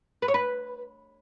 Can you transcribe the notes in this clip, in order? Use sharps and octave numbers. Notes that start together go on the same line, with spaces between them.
B4
C#5
B4